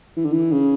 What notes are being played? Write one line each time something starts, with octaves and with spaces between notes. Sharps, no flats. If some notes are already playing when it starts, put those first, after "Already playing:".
E3
D3
E3
C#3